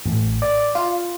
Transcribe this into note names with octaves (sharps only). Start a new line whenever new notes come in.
A1
D5
F4